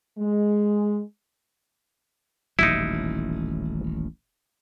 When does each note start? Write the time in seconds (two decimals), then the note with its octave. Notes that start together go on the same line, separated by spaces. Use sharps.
0.17 G#3
2.59 D#1 A1 F#3 D#4 E4